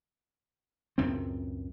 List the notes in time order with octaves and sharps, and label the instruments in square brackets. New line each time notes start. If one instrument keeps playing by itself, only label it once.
[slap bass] C#2 F#2 A2 C4